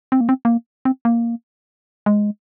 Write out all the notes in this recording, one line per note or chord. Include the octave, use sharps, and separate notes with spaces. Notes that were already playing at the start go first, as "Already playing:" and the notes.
C4
A#3
C4
A#3
C4
A#3
G#3